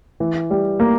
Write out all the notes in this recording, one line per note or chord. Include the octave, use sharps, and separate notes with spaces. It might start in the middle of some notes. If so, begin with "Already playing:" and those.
E3
G3
A#3